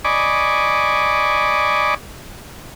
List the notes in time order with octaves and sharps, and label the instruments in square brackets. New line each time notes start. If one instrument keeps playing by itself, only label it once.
[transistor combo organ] D5 D#5 G#5 B5 C#6 D6